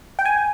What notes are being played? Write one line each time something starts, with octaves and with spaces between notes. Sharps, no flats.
G5
G#5